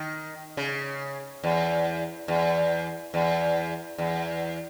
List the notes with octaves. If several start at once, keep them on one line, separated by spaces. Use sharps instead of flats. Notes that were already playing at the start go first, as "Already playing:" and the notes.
Already playing: D#3
C#3
E2
E2
E2
E2